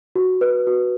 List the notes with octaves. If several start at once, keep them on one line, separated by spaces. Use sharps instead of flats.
F#4
B4
F#4